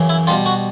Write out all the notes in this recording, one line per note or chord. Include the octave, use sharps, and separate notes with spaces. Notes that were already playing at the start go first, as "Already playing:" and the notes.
Already playing: F#2 C#3 E3
E4
B2 G3 F4
F#4